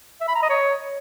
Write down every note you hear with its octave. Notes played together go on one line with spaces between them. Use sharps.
E5
B5
A#5
D#5
C#5